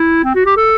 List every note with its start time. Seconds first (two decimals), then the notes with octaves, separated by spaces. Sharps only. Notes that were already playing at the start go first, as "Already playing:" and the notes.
Already playing: E4
0.24 C4
0.35 F#4
0.46 G4
0.57 A4